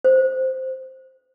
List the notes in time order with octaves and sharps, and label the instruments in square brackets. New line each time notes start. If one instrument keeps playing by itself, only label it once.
[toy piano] C5